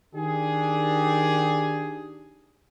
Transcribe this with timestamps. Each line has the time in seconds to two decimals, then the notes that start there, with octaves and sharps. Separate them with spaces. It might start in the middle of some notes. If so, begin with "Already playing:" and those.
0.14 D#3 D4 G4 G#4